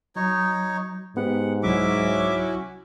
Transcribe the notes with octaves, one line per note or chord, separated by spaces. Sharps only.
F#3 D#4 C#5
G#2 B3 G4 F#5
C2 F#3 C#4 E4 F#4 E5 D6